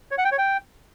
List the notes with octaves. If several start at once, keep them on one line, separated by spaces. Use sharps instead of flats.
C#5
F#5
G5
C#5
G5